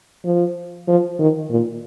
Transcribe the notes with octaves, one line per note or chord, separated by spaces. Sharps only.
F3
F3
D#3
A#2